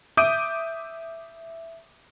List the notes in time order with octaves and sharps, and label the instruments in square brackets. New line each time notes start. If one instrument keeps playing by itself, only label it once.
[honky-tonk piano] E5 D6 D#6 G6 D7 D#7